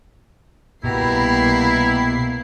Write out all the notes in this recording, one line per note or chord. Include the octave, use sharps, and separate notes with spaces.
C2 B2 A#3 B3 E4 G4 A#5 C7